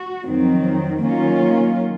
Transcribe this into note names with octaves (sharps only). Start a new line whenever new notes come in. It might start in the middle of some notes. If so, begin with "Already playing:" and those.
Already playing: F#4
F2 D#3 F#3 C4
D#3 F#3 A#3 C#4 F4